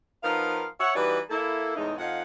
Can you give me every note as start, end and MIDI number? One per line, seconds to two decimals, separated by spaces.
0.23 0.64 53
0.23 0.64 59
0.23 0.64 63
0.23 0.64 70
0.23 0.64 77
0.79 0.93 73
0.79 0.93 76
0.79 0.93 78
0.95 1.18 52
0.95 1.18 55
0.95 1.18 63
0.95 1.18 66
0.95 1.18 71
0.95 1.18 74
1.29 1.74 58
1.29 1.74 64
1.29 1.74 69
1.76 1.94 40
1.76 1.94 45
1.76 1.94 56
1.76 1.94 63
1.98 2.22 41
1.98 2.22 63
1.98 2.22 77
1.98 2.22 78